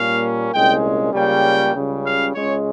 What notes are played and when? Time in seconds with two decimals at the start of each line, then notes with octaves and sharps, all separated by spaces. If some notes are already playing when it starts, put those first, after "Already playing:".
Already playing: A#2 G3 A#3 C#4 F5
0.53 C2 A#2 G#3 C#4 G5
1.13 C#2 C#3 G3 A#3 C#4 G5
1.75 C#2 C#3 G3
2.05 F5
2.34 C#2 C#3 G#3 C#4 C#5